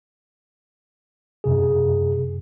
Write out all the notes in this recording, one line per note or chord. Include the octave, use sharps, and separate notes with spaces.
F#2 C3 G#4